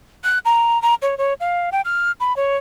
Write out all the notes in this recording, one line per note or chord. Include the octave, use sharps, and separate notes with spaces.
F#6
A#5
A#5
C#5
C#5
F5
G5
F6
B5
C#5